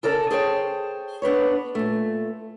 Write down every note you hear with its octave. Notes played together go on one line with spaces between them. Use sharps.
C#3 A4 A#4 D5 A5
G#4 C5 C#5 G5 A5
B3 D4 B4 C#5
A#2 A3